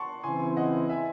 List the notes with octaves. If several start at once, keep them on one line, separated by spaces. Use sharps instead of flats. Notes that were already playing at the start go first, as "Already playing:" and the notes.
Already playing: F#5 A5 C6 C#6
C#3 E3 C4 E4 G#5 C6
D#5 F#5
E5 G#5